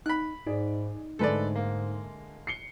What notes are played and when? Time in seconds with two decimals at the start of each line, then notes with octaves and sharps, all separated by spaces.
0.06 D#4 B5 F#6
0.46 G#2 D#4 G#4 D5
1.19 G#2 D3 G#3 A3 A4 B4 D5
1.56 A#3
2.47 C7 C#7 G7